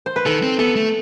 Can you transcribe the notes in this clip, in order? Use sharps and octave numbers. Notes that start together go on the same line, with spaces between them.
C5
B4
D#3 A4
C4
B3 A4
A3